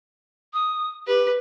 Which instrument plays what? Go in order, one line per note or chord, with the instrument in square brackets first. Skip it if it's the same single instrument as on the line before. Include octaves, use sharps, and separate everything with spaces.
[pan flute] D#6
[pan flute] G4 [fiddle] B4